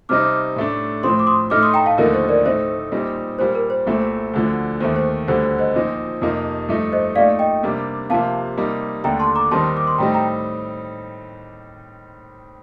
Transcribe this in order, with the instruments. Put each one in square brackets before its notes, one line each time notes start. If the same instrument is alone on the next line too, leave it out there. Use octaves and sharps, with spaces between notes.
[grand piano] C3 G3 C4 D#4 [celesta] D6 F6
[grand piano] A2 A3 D4
[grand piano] A2 F3 C4 [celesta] C6 D#6
[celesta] D6
C6 D#6
[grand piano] A2 A3 D#4 [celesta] D6 F6
[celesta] C6 D#6
G5 A#5
F5 A5
[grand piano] D#2 D3 F3 A3 D#4 [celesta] A#4
[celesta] C5
A#4 D5
[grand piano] A2 A3 C4 D#4 [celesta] C5
[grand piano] A#2 G3 C4 D#4
[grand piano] A#2 G3 A#3 [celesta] C5
[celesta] A#4
C5
[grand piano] C2 A#2 A3 C4
D2 D3 F3
[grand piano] D#2 D#3 A3 [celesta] C5
[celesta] C5
[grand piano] D2 D3 G3 [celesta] C5
[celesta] C5
C5 D#5
[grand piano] A#2 F3 C4 D#4
F2 C3 F3 A#3 D#4
G2 F3 A3 D#4
[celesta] C5 D#5
[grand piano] A#2 A3 D#4 [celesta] D5 F5
[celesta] D#5 G5
[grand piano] C3 G3 A#3 D4
[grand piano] C3 F3 A#3 [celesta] F5 A5
[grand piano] C3 G3 A#3 D#4
[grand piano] D#2 D3 A3 D4 [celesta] G5 A#5
[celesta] A5 C6
A#5 D6
[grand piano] D#2 D#3 G3 C4 D#4 [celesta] A5 C6
[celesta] D6
C6
[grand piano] A2 G3 C4 D#4 [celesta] G5 A#5
[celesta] G5 A#5